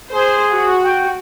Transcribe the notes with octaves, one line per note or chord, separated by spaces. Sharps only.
G#4 C5
F#4
G5